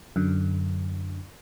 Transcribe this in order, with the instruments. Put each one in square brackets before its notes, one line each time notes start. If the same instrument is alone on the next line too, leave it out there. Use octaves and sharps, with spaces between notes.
[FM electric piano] F#2 D3